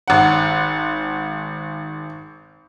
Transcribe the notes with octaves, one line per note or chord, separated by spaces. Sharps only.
G#1 F#5